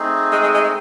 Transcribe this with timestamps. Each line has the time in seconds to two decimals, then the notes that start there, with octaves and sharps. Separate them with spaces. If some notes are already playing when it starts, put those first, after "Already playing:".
Already playing: A3 C4 D#4 G#4
0.32 G#3
0.42 G#3
0.54 G#3